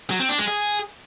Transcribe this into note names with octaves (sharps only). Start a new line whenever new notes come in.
F#3
C4
D4
G#3
G#4